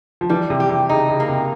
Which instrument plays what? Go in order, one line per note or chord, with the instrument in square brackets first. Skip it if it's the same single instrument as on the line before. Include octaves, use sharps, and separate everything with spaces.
[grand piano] F3
[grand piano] E3 [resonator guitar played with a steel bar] G3
[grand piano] C3
[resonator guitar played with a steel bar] G4
[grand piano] C3
[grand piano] C#3 [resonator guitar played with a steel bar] D#4
[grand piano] C#3
[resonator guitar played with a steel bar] A#3
[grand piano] C3